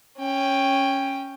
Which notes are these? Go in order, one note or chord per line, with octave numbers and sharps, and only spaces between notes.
C#4 G5